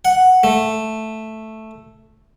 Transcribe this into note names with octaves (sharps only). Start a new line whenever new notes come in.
F#5
A3